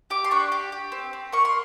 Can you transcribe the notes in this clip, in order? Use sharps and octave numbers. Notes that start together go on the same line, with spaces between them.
G4 D6
C6
D4 C#6
G4
G4
C4
C4
A#3 C#6
C6